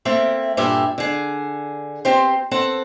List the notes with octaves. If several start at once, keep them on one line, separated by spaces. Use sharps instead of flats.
A3 A#3 C4 E5
G2 A#2 G4 A4 E5 G#5
D3 G#4
C4 G4 C5
C4 A4 F#5